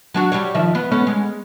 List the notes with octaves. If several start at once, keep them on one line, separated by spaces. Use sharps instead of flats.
F#3 D4 F#4
G3 G4 C#5
D#3 F3 E5
B3
A3 B3 C#4
G#3